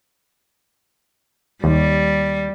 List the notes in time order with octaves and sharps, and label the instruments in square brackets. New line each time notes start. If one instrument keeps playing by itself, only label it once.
[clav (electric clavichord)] D#2 [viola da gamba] G3